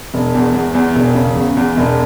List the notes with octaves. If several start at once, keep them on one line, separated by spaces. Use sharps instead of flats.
E1
E2
E2
E2
E1
C#3
E2
E2
E1